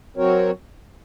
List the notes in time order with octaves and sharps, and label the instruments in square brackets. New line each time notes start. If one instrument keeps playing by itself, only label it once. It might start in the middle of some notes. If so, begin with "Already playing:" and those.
[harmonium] F#3 C4 F#4 A#4 C#5